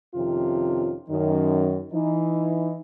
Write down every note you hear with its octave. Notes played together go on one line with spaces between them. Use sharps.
F2 C3 D#3 F3 C#4 F4
F#2 D#3
E3 D#4